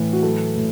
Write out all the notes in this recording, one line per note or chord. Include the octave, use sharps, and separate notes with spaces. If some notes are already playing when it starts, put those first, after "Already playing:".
Already playing: A2 E3
F#4
F#3 A4
A2